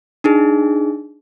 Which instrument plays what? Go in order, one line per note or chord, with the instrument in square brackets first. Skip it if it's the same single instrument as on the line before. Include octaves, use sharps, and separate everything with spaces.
[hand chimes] D4 D#4 G#4